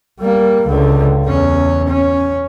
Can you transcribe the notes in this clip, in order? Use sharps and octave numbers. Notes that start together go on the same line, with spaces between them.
G3 A#3
C#2 D3
E2 C#4
C#4